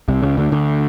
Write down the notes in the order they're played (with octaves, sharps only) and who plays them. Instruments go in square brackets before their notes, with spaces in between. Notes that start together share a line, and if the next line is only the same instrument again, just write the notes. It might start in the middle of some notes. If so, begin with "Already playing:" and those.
[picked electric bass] C2 C3
C#2 C#3
D2 D3
D2 D3